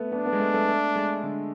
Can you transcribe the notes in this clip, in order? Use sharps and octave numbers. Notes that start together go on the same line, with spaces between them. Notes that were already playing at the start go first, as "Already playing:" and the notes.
Already playing: A3 B3
B3 D4
B3
G#3
A3
A3
A3
G#3
D3